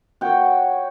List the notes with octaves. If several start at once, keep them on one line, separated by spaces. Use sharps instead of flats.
F#4 C#5 G5